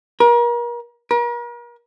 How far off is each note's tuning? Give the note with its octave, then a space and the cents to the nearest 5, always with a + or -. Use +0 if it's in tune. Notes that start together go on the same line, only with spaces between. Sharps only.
A#4 +35
A#4 +40